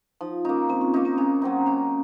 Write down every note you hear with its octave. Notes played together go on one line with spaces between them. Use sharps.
F3 D#4
A#3 C#4 D#4
F3 C4
C#4
A#3 C#4 D#4
C4
C#3 C#4
F#3 C4 D#4
C#3 C#4